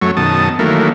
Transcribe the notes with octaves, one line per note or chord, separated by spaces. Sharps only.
F#2 F#3 A3 C#5
F#2 B2 D#3 A5 D#6
D#3 E3 F#3 A3 A#3